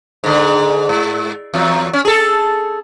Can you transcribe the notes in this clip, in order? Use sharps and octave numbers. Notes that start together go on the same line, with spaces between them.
G#2 D3
G#2
E2 F#3
C#4
G#4 A4